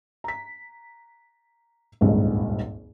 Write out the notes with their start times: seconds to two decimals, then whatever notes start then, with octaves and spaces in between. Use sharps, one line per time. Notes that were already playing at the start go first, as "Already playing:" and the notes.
0.24 A#5 B6
2.01 D#1 G#1 C#2 G2 D#3